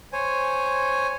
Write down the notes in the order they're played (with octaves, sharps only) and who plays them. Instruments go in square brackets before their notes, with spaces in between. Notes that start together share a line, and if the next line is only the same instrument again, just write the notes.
[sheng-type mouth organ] C5 C#5 G#5